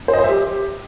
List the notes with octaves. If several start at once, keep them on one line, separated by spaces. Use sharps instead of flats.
C5
D#5
C5
E5
G4